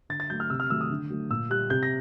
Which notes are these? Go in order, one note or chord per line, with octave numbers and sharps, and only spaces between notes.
D3 A6
A6
F#3 A3 G6
F6
C3 E6
F6
D#3 F#3 A3 E6
D#6
D3
F#3 A3
A#2 E6
G3 F#6
C3 G6
A#6